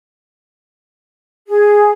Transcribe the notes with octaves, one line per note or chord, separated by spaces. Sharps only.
G#4